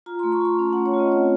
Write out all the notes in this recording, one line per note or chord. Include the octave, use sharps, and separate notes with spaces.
F4 A#5
A3 C6
C#6
F4 C6
C#4 A5
A3 F#5
C#5
F4
D#5
C4 C#5